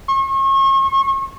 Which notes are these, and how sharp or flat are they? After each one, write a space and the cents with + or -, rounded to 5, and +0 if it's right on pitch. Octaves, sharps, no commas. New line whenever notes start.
C#6 -40